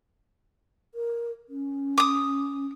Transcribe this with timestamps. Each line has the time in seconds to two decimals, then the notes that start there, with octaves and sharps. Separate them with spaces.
0.95 A#4
1.49 C#4
1.98 D6 D#6